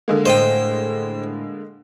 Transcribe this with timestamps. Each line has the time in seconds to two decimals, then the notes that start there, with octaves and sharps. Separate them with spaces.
0.08 D3 G#3 A#3
0.26 A2 C5 D#5 G5